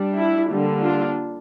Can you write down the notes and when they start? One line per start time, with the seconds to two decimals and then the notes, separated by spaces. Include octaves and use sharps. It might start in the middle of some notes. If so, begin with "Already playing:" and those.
Already playing: G3 D4
0.18 E4
0.49 D3 G3 A#3
0.81 D4 F4